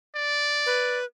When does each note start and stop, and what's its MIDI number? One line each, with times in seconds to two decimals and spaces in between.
0.15 0.98 74
0.66 1.04 71